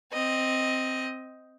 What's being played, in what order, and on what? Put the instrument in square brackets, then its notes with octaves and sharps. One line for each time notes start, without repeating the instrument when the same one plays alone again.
[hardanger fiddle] C4 D#5